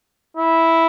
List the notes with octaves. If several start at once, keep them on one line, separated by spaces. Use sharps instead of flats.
E4